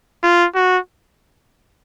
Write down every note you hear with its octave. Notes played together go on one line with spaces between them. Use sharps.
F4
F#4